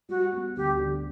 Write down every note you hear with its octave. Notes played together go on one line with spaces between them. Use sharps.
G3 F#4
B3
D2 G4
D3